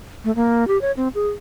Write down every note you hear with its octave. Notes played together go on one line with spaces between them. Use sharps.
A3
A#3
G4
C#5
C4
G#4